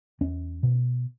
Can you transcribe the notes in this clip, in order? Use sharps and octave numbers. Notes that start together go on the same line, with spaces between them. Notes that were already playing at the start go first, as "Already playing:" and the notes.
E2 C#4
B2